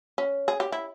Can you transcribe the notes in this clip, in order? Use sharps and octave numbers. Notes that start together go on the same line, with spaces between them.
C#4
G#4
G4
E4